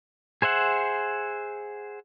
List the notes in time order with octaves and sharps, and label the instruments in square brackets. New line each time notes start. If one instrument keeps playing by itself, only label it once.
[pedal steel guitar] G#4 C5 E5 F#5